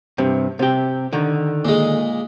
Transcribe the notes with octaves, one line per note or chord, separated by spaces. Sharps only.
G2 C3
C3 G4
D3 D#3
A#2 G#3